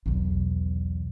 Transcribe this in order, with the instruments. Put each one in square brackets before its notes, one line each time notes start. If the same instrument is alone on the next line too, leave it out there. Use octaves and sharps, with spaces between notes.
[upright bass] B1 E2